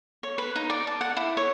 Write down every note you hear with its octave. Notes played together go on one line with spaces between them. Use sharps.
C#5
B4
D#4
D5
A5
F#5
E4
C#5